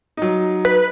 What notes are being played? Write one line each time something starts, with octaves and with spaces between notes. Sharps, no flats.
F#3 D#4
B4